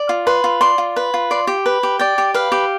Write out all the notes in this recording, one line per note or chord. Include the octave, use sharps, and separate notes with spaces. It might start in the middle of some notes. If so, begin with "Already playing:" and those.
Already playing: D5
F4
B4 C6
F4
D5 C6
F4
B4
F4
D5 C6
G4
B4
G4
D5 G5
G4
B4 F5
G4